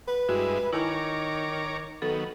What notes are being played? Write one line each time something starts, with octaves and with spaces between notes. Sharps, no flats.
B4
G2 G#3 E4 F#4
D#3 E4 C#5 G#5 A#5 D6
D#3 F#3 B3 A4